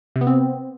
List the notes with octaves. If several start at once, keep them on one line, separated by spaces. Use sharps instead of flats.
C3
B3
C4